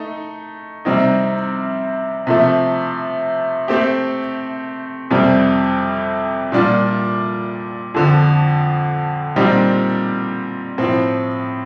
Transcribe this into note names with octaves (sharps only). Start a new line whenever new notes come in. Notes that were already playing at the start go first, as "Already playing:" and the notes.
Already playing: A3 D#4
C3 G3 C4 D#4
C3 F3 A3
A3 C4 G4
F2 C3 G3 C4
A#2 G3 D4 F4
F2 D3 F3
A#2 G3 C4 D#4 G4
A2 F3 C4